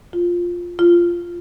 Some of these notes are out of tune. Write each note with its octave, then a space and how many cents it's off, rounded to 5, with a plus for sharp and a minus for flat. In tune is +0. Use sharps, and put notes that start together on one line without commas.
F4 +5
F4 -10